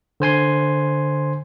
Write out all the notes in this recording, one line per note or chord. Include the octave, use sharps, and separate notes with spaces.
D3 C5 G#5 C6